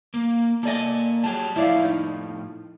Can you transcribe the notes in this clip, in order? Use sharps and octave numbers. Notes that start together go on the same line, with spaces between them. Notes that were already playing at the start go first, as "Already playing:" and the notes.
A#3
A#3 A4 D5 D#5 G#5
F#3 G3 G#4 A5
A2 F3 E4 D5 F5
D#4